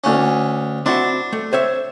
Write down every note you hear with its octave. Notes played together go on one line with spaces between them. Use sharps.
D2 C#4
C4 D4 E4 F#4
A3
C5 C#5 E5